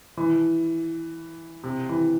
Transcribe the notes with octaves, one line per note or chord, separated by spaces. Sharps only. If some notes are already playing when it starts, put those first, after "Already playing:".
E3
C3
E3